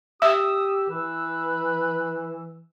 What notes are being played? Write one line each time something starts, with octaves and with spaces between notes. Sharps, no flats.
G4 E5 D#6 E6
E3 B4